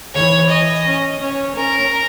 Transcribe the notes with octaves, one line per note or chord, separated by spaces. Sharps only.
E3 C#5
D#5
C#4
C#4 C#5
C#4 A#4